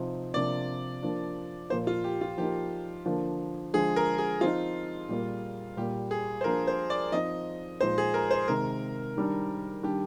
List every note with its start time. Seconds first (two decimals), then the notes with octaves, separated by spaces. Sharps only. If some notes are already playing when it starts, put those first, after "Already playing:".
Already playing: C3 F3 C4 D#4
0.34 C3 F3 A#3 D4 D5
1.02 F3 A#3 D4
1.70 A#2 F3 A#3 C5
1.87 F4
2.04 G4
2.21 F4
2.38 F3 A#3 D#4 G4
3.06 D3 F3 A#3 D4
3.73 D3 F3 G#3 G#4
3.96 A#4
4.18 G#4
4.41 F3 C4 D#4 F4
5.09 A#2 G3 A#3
5.77 A#2 G3 A#3 G4
6.11 G#4
6.41 C5
6.44 F3 A#3 D4 A#4
6.67 C5
6.90 D5
7.12 F3 C4 D#4 D#5
7.81 A#2 F3 G#3 D#4 C5
7.98 G#4
8.14 A#4
8.31 C5
8.48 C3 D#3 G#3 A#4
9.17 D#3 G3 D4
9.83 D#3 G3 D4 G4